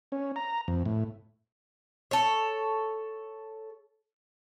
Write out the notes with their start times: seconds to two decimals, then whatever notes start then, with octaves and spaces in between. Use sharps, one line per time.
0.12 C#4
0.36 A#5
0.68 F2
0.86 A2
2.11 A4 C#5